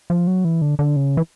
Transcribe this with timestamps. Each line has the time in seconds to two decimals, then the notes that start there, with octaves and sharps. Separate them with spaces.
0.10 F3
0.27 F#3
0.45 E3
0.62 D3
0.79 D3
0.96 C#3
1.17 E3